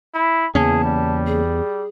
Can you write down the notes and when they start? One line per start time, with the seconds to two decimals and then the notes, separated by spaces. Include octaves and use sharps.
0.15 E4 B5
0.55 E2 C#3 A#3 C#4 G#4 A5
0.84 G3
1.27 G#4